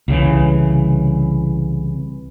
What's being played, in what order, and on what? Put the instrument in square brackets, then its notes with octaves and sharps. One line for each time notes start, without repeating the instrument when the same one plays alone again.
[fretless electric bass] C2 C#3 E3